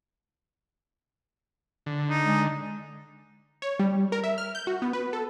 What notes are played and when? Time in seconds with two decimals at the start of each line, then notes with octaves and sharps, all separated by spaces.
1.86 D3
2.10 D#4
2.24 G#3
3.62 C#5
3.79 G3
4.12 A#4
4.24 E5
4.38 F6
4.55 G6
4.67 F#4
4.82 B3
4.93 B4
5.13 A4